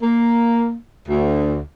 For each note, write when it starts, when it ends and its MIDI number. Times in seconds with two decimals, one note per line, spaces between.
0.02 0.75 58
1.08 1.60 38